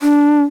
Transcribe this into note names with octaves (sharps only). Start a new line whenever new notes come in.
D4